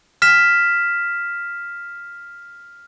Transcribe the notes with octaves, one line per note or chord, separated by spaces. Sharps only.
F6 B6 E7